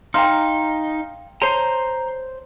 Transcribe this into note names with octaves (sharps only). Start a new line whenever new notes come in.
D#4 F5 G5 A#5 C6
C5 C#5 A5 A#5 C6